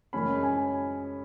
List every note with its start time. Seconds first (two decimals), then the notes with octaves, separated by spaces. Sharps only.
0.13 F#2 C#3 G#3 C#4 B5
0.43 G#5